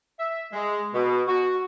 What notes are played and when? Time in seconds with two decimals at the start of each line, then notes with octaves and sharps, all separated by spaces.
0.20 E5
0.53 G#3
0.94 B2
1.27 F#4